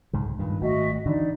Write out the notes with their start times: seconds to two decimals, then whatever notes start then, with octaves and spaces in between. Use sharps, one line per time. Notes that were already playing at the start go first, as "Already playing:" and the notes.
0.13 C2 G#2 C#3
0.39 G2 A#2 D#3 B4
0.61 G#1 A3 F#4 D#5 E5
1.06 D3 E3 D4 D#4 D5